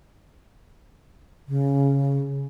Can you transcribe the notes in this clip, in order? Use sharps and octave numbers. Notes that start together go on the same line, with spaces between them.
C#3